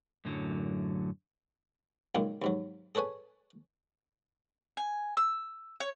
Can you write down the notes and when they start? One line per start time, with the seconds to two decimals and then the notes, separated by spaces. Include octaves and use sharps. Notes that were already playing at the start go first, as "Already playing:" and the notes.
0.25 F#2 A2 D3 F#3
2.15 C#2 F#2 A#2 D#3 A#3
2.42 D#2 G#2 F#3
2.95 G#4 A4 B4 C#5 G#5
4.77 G#5
5.17 E6
5.80 C#5